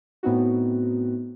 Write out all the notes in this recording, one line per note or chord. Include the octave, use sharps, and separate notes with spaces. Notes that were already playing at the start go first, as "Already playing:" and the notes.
A2 B3 C4 D#4 F#4